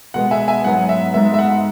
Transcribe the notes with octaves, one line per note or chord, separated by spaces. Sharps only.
B2 G#3 B3 F#5
E5 G#5
E5 G#5
G#2 F#3 B3 F#5
E5
G#2 G#3 B3 E5
E5
F#5